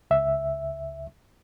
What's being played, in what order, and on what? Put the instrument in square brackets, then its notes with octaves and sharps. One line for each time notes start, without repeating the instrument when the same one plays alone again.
[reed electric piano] C#2 E5